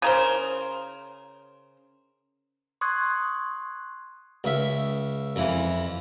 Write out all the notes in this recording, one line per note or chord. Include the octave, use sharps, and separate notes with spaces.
C#3 A#4 C5
C6 C#6 D#6 F#6 G#6
C#2 E5
F2 E3